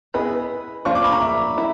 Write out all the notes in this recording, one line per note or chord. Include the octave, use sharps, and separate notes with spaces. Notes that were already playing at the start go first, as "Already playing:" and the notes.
B3 E4 G#4 B4 D#5 B5
F3 A#3 D4 F4 C#6
D6
B5
A#5
E5
E4